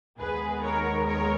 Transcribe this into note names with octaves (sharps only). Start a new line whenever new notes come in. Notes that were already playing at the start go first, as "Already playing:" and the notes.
D#2 D#3 G#3 B3 G#4 B4
A#4 C#5
A#4 C#5